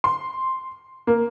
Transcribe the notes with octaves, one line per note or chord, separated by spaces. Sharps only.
C6
A#3